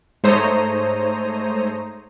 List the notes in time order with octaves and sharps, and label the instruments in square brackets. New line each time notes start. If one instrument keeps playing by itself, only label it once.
[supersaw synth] G#2 A3 C5 C#5 A#5 D#6